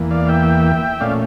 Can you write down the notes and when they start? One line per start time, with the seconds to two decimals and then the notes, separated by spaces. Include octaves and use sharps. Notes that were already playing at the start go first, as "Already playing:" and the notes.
Already playing: E2 E3 A#3
0.11 D5 F5
0.28 E5 G5
1.00 A#2 A3 C#4 D5 F5